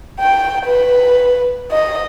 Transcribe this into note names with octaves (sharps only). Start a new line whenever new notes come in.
G5
B4
D#5